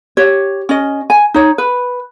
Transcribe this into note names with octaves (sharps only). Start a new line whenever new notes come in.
G4 C#5
C#4 D#5
G#5
D#4 C#5
B4